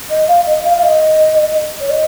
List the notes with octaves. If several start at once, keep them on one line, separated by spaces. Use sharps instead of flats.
D#5
F5
D#5
F5
F5
D#5
C#5
D#5